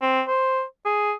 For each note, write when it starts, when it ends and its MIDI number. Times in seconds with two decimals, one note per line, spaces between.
0.02 0.22 60
0.28 0.63 72
0.85 1.13 68